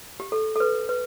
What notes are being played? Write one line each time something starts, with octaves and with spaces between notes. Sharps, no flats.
G4
A4
A4
B4
B4